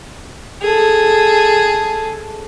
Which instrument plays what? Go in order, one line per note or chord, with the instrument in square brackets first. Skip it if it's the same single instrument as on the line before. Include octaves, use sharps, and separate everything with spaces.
[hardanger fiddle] G#4 A4